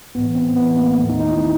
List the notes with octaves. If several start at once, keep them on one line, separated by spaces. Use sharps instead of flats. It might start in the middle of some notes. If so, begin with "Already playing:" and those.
B1 A2 E3 B3
C4
B1 A2 E3 B3
A#3
D#2 D#3 A3
D#4
D#4
E4